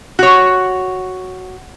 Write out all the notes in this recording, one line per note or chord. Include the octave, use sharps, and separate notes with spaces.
F#4 C#5